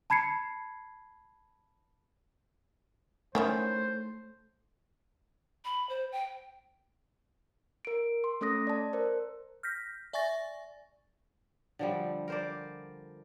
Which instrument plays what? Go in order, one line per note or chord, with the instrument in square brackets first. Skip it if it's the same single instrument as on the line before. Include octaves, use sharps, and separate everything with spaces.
[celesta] A5 B5 G#6 C7 C#7
[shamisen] D#3 C#4 E4 [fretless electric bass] A3 [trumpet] C5
[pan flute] B5
C5
G5
[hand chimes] A#4 D7
C6
A3 C#4 A4 D#6 A#6
D5 A5
A#4 C5
[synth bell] F6 G6 A#6 B6
D5 E5 G#5 C#6 A6 A#6
[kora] D3 F3 G3
A#4 C5 D5